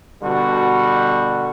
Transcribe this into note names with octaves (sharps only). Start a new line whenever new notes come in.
B2 D3 G3 F#4